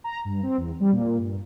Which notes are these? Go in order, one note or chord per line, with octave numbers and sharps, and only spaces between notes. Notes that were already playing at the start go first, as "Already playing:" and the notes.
A#5
G2
C4
E2
G3
A#2
G2